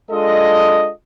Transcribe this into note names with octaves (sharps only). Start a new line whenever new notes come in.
G#3 D4 F4 A4 D#5